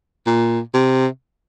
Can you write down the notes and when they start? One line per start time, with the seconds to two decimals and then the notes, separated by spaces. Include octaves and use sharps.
0.27 A#2
0.74 C3